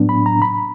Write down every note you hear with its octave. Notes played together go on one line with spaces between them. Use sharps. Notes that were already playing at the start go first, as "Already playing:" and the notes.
Already playing: A2 F#3 B3 D4
B5
A#5
B5